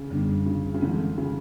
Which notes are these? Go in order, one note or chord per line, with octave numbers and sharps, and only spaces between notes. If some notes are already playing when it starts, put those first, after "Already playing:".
Already playing: C#3
F#2 D3 G3 B3 D4
C#3
C#3
D3 E3 G#3 C#4
C#3